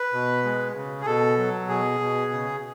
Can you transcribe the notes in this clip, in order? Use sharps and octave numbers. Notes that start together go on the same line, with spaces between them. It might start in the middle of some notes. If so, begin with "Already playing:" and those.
Already playing: B4
B2
G#3
C#3
G#4
B2 A4
F#3
B2 G#4
B2
C#3